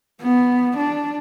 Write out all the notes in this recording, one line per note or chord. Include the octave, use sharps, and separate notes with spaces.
B3
D4